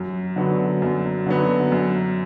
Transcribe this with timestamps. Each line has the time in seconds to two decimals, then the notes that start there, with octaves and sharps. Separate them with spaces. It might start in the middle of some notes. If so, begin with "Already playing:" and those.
Already playing: F#2
0.36 D3 F#3 B3
0.82 F#2
1.26 D3 F#3 B3
1.72 F#2